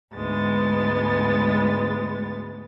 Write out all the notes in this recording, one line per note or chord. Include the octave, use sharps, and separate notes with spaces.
D2 G#2 G#3 B3 A6